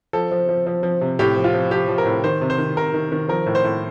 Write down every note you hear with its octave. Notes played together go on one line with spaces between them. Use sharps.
F3 A4
F3
F3
F3
F3
C3
A2 G4
F3
F4
F3
F3 G4
F3
A#4
A2
D#3 C5
C3
C5
D#3
C3 A#4
D#3
D#3
F3 A#4
A2
C5
A2